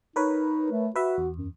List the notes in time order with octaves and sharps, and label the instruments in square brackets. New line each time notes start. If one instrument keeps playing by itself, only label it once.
[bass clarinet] D#4 [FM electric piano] A#4 B4 C#5
[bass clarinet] A3
[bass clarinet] F#4 [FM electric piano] B4 E5
[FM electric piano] E2
[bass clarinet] F#2